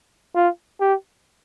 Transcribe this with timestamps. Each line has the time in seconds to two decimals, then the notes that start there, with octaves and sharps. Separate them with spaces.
0.35 F4
0.81 G4